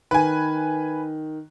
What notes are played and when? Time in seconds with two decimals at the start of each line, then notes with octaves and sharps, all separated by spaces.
0.11 D#3 B4 G#5